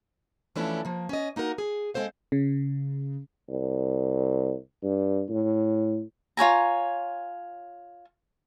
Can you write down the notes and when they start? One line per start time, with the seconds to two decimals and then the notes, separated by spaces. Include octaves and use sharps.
0.56 E3 F3 A3 C#4 D4 E4
0.85 F3 A#3
1.09 C#4 D#5
1.36 A#3 D#4 F#4 A#4
1.58 G#4
1.94 G#3 C4 A4 C5 F5
2.32 C#3
3.49 C2
4.83 G2
5.29 A2
6.37 F4 C#5 G#5 A#5